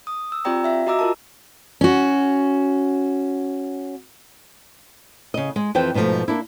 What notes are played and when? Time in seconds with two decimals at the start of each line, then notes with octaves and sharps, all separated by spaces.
0.07 D#6
0.32 E6
0.45 C4 F4 G4 D5 G5 A#5
0.64 E5 F5
0.87 F#4 D#5 A#5 D6 E6
0.99 F4 A#4 A5
1.81 C#4 F#4
5.34 C#3 D#5
5.56 G#3
5.75 F2 E3 C5 G5
5.94 G#2 B2 D3 F3 A3
6.28 A#3 D4 E4